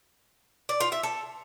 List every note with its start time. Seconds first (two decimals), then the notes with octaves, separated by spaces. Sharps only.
0.69 D5
0.80 F4
0.92 E5
1.03 A4